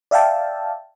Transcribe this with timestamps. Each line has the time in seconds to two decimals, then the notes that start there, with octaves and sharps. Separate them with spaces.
0.11 D5 E5 F5 G5 A5